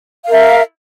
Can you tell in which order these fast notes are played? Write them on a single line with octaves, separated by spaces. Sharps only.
F5 A#4 E5